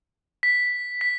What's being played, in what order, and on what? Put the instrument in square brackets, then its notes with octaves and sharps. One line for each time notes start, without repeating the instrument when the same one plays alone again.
[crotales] B6
B6